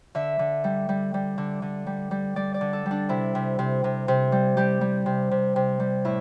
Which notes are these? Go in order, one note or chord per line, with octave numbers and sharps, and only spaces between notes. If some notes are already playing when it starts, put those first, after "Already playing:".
D3 E5
D3
G3
G3
G3
D3
D3
G3
G3
G3 D5
D5
D3
A4
G3
D4
C3 E4
C3
C3
C3
C3
G3
G3 G4
G3
C3
C3
C3
G3
A2 E4